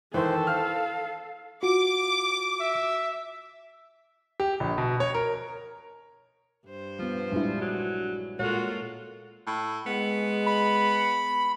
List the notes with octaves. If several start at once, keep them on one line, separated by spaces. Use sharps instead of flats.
D#3 E3 A4 C5
F5 F6
F4 F#4 D6
E5
G4
A#1
B2
C#5
A#4
G2 C5
F3 G3 B3
A#1 G3 G#3 D4 E4
F#3
A#2 G#3 F4 F#4 A4 A#4 C#5
A2
G#3 B3
B5